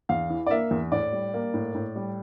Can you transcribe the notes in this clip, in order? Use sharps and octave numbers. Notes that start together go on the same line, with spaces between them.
E2 F5
E3
D5
A#3 E5
E2
A2 D5
G3
A#3
A2
A2
G3